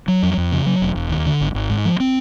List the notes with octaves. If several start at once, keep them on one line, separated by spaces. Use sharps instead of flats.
F#3
F2
F2
C#3
F#3
E1
E1
D#2
D3
G#1
G#1
G#2
F3
C4